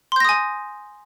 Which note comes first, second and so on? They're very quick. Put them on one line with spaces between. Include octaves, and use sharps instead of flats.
C6 G6 A#6 D#6 G#5